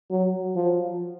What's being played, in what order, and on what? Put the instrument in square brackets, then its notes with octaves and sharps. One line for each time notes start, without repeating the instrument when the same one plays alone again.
[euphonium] F#3
F3